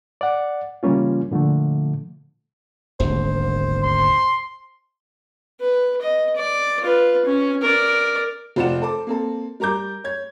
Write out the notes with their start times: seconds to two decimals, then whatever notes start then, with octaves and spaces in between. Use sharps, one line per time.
0.21 D5 F#5
0.83 C#3 E3 G3 A#3 C#4 F4
1.31 A#2 D3 F3 A3
3.00 D#1 G#1 D2 C5
3.84 C6
5.60 B4
6.01 D#5
6.36 D5
6.81 F4 B4
7.25 C#4
7.62 A#4 D5
8.56 F1 F4 C5 D5 F#5 E7
8.82 A4 C5 D6
9.07 A#3 C4 A4
9.60 G3 A#4 A#5 D6 G6
10.04 C#5 G#6